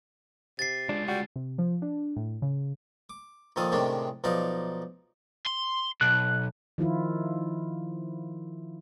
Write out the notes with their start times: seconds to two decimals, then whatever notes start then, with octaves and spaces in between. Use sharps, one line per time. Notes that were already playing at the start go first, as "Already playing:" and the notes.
0.59 C3 A6 C7
0.89 G#3 D4 F4
1.08 G3 F#4
1.36 C3
1.58 F3
1.82 D4
2.16 A2
2.42 C#3
3.10 D6
3.56 A#2 D#3 F3 A4 F5 D#6
3.72 A2 C3 D#3 G#3 C#4 D4
4.24 B1 F3 D#4 D5 F5 A#5
5.46 C6
6.01 B1 F#6
6.78 D#3 F3 E4 F4